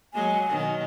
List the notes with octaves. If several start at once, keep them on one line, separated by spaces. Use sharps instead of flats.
F#3 G#3 A#3 G#5
B2 D#3 F#3